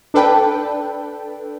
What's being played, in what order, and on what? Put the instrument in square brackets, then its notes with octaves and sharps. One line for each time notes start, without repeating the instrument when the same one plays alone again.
[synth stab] D4 A4 B4 G5